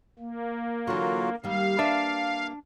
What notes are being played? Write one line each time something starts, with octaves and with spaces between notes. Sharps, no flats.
A#3
D3 E3 F#3 F4 F#4
D#3 G3 A#3 F5
D4 B4 E5